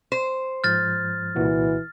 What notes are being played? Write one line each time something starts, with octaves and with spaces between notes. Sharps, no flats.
C5
G#2 F3 F6 G6 A6
C2 A#2 E3 F#4